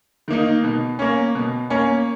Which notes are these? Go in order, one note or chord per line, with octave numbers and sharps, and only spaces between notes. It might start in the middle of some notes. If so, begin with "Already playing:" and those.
D#3 A#3 D#4
B2
A#3 C#4
B2
A#3 C#4